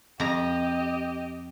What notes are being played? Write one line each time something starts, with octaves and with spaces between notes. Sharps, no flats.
F2 G4 D#5 A#5